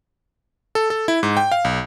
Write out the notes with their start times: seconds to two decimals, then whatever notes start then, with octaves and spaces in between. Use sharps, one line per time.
0.75 A4
0.90 A4
1.08 E4
1.23 G#2
1.37 G5
1.52 F5
1.65 B1